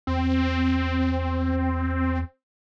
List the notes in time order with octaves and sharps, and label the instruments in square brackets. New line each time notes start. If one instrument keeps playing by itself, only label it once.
[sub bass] E2 [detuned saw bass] C4